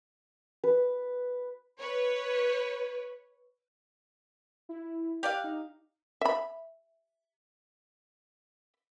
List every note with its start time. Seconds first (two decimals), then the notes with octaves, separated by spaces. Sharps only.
0.64 B4
1.78 B4 C#5
4.69 E4
5.23 G4 D5 F5 F#6
5.44 D#4
6.21 E5 B5